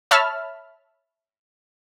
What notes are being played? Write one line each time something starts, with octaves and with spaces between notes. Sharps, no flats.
C#5 E5 A5 B5 E6 F6